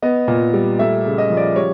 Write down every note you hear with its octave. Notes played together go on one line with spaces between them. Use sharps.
B3 D#5
A#2
G3
A3 E5
C#3
D#5
F3
D5
G3 C#5